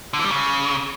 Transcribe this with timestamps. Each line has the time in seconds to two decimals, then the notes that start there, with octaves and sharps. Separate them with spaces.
0.13 D3
0.19 E3
0.25 G3
0.31 C#3